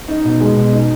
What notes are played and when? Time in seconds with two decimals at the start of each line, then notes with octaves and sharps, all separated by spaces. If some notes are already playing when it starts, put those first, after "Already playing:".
0.08 D#4
0.25 B2
0.40 G#3
0.57 B2
0.72 D#4